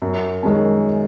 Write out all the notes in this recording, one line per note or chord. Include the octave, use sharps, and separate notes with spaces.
F#2
D#3 G#3 C#4